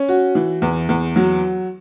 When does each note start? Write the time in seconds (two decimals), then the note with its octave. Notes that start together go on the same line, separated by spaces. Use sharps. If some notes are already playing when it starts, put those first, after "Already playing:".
Already playing: C#4
0.09 F#4
0.35 E3
0.62 E2
0.89 E2
1.16 F#3